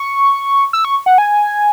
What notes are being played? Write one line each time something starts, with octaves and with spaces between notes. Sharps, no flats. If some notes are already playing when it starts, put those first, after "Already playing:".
Already playing: C#6
E6
C#6
F#5
G#5